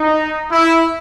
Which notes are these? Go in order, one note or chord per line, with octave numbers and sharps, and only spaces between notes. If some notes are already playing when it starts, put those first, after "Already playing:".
Already playing: D#4
E4